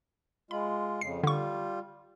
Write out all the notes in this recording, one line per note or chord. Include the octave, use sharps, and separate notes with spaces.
G#3 F4 B5
F2 C#3 C7
D3 G3 F4 C#6